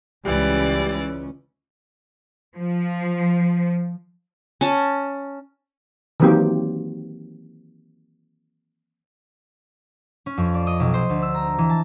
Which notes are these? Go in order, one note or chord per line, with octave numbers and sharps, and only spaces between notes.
C#2 E3 G3 C#4 D5
F3
C#4 A5
D#3 E3 F#3 A#3 C4 G4
C#4
F2
D5
D#5
B1
C5
D2
E6
A#5
E3
A5